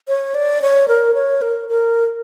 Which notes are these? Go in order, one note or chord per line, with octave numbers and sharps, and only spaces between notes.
C#5
D5
C#5
A#4
C#5
A#4
A#4